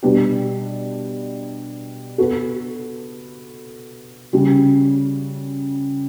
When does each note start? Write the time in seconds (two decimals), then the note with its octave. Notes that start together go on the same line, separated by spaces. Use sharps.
0.03 B2 G3 B3 D4 G4
2.18 B3 F#4 A4
4.33 C#3 G3 C#4 F#4